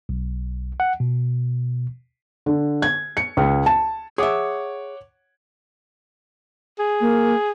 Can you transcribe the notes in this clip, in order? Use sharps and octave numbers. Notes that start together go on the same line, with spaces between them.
B1
F#5
B2
D3
G#6
C#7
C#2
A5
G#4 C#5 E5 F#5 D6
G#4
A#3